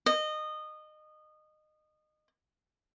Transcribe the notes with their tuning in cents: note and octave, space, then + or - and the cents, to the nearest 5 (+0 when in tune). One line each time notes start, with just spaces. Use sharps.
D#5 -20